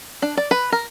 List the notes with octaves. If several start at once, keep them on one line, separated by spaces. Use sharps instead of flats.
D4
D5
B4
A#4